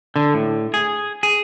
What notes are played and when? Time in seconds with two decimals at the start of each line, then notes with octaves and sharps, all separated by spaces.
0.16 D3
0.34 A2
0.74 G#4
1.23 G#4